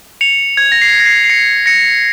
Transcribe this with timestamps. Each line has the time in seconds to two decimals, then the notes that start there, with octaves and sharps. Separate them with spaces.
0.21 C#7 F7
0.57 G#6
0.72 A#6
0.82 C7
1.00 A#6
1.06 C7
1.24 C7
1.30 A#6 C#7
1.66 A#6 C#7